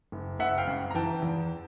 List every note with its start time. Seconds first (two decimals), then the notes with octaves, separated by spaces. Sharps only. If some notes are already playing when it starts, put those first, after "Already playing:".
0.12 F#1
0.39 F#1 E5 F#5
0.58 F5 G5
0.67 F#2
0.91 A#5
0.95 E3 G5 A5
1.22 E2